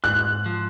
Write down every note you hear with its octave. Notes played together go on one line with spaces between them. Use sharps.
G#2 F#6
F3